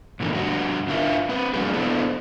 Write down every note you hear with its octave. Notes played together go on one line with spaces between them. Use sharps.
G#2 D3 E3 A#3
G2 D3 F#4
D4 E4 F4 A4 A#4 E5
C4 B4
D3 F#3 G3 A#3 F#4 G#4
B3 D4 E4 A4 B4 C5